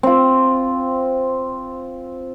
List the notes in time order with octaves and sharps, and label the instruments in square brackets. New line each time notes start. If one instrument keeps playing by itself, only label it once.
[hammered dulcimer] C4 F4